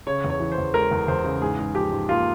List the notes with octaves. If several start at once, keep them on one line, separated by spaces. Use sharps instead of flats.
C#3 C#5
E2
C#5
E3
C5
E2
G#3 A#4
E2
E2 C5
C#3
G#2 G#4
G#2
F3 G4
G#2
A#3 F4